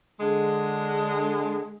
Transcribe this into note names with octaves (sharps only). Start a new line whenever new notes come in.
D3 G#3